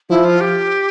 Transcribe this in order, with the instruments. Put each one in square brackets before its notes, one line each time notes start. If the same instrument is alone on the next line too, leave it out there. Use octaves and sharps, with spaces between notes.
[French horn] F3 [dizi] E4
[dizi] F4
G4